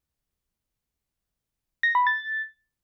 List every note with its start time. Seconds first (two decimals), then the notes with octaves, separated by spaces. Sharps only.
1.83 A#6
1.95 B5
2.07 A6